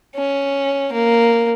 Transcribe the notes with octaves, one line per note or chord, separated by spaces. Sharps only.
C#4
A#3